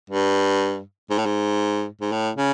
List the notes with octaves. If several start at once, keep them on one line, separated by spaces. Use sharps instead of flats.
G2
G#2
A2
G#2
G#2
A2
C#3